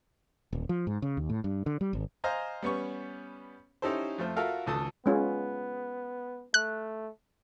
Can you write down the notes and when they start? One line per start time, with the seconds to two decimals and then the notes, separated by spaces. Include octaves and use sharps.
0.53 D#1
0.69 F3
0.87 G#2
1.02 C#3
1.17 D#2
1.30 A2
1.44 G2
1.66 D3
1.81 G3
1.93 G#1
2.24 C5 D#5 F5 G#5 A#5
2.62 G3 B3 C#4 C#6
3.82 C#4 D#4 E4 G4 A4 C5
4.18 F2 A3 F4 C5
4.36 F4 F#4 A4 A#4 E5 F5
4.66 G#1 C#2 A4 A5 D#6
5.06 G#3 B3 C#4 F4
6.54 A3 F#6